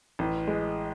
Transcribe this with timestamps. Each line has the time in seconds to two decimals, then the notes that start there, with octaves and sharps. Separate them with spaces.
0.19 A1
0.47 G#3